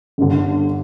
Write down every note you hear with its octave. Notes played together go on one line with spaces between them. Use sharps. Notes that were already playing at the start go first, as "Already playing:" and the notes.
G1 G2 D3